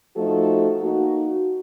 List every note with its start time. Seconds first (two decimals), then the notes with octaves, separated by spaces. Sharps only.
0.16 F3 A3 D#4 F#4 A4
0.81 A#3 D#4 F#4